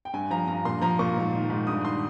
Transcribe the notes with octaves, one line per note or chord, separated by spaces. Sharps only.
G5
G2 G#5
F3 A#5
G2 A#5
A#2 C6
F3 A#5
A#2 C#6
G#2
D#3
G#2
G2 D#6
D#3 C6